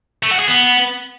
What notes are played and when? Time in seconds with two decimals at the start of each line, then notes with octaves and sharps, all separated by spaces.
0.23 A3
0.31 F#4
0.39 G#4
0.48 B3